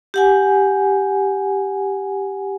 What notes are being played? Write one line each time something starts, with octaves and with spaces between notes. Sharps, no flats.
G4 F#5 G#5